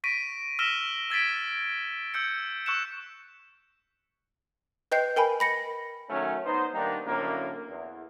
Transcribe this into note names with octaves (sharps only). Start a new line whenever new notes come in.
C#6 A#6 B6 D7 D#7
E6 F6 A#6 B6 E7 G7
E6 G#6 A6 B6 D7
E6 G6 C#7
C#6 E6 F#6 C#7 E7
B4 D#5 G5 G6 C7
A#4 G5 G#5 B5
B5 A#6 C#7
D#3 F#3 A3 C#4
B3 D#4 C5
D#3 G3 A#3 B3 D4 D#4
F#2 A2 D3 A#3
E2